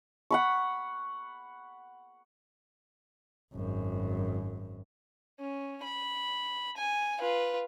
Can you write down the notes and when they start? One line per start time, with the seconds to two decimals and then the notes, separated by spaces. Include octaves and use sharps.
0.31 F#5 B5 C#6
3.54 G#1 F#2
5.40 C#4
5.84 B5
6.77 G#5
7.19 F4 B4